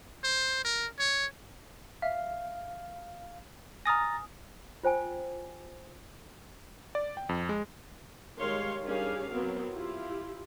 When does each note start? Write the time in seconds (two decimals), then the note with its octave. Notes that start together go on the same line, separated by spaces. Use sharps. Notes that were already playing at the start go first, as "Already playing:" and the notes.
0.24 C5
0.65 A#4
0.99 C#5
2.02 E5 F5
3.86 G#5 A#5 D#6 F6 A6 A#6
4.83 F4 C5 G5 G#5
6.95 D5
7.17 G5
7.29 F2
7.49 G#3
8.38 D#3 G3 G#3 C#5 F5 C6
8.85 D#3 G3 C#4 D4 G#4 F5
9.32 F#3 B3 C4 A#4
9.73 E4 F4 G4